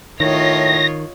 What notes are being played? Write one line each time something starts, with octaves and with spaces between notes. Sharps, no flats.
A2 D#3 F4 C#5 D#5 A#6